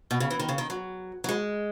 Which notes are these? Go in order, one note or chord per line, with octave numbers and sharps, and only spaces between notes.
B2
C#3
E3
D#3
C#3
D#3
F#3
F#3
G#3